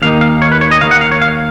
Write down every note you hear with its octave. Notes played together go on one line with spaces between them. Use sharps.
D#2 D#3 A#3 D#4 F5
F5
C#5
B4
C#5
D#5
D#2 D#3 A#3 F5
F#5
F5
C#5
F5